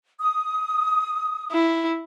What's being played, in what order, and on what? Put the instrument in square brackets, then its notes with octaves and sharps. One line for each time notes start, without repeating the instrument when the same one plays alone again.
[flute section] D#6
[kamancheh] E4